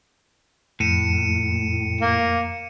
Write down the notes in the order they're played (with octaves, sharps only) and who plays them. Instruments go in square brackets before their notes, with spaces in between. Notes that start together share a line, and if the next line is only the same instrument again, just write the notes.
[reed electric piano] F2 [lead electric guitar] A2 [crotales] C#7 D#7 E7
[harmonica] A#3